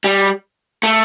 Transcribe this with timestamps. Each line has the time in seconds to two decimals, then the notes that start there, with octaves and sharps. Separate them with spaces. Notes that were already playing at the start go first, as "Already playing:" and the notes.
0.04 G3
0.83 A3